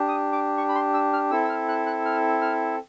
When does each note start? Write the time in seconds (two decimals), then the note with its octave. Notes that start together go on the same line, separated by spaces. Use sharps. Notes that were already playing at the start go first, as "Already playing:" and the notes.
Already playing: D4 G4
0.08 D#6
0.32 D6
0.58 C#6
0.69 B5
0.75 C6
0.94 E6
1.13 F6
1.31 C4 E4 A4 E6
1.44 E6
1.49 F6
1.68 F#6
1.86 F#6
2.05 F6
2.41 F6